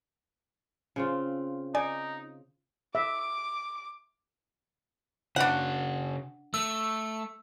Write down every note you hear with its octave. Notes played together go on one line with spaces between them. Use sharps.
C#3 C4 F4
D#4 D5 G#5
E5 D6
C#3 D4 F#4 F#5
A3 E6